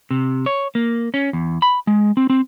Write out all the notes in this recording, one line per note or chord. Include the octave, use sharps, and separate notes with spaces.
C3
C#5
A#3
C#4
E2
B5
G#3
C4
C4